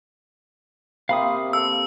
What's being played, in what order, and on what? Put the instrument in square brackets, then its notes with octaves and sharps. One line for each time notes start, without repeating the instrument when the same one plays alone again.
[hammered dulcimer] C3 A#3 G5 [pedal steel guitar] F5 B5 D#6
[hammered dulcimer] A4 [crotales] E6